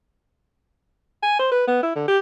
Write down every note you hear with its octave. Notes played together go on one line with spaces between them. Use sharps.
G#5
C5
B4
B3
E4
D3
G4